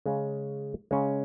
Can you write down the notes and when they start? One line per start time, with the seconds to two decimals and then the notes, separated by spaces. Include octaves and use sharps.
0.06 C#3 G#3 C#4
0.91 C#3 G#3 C#4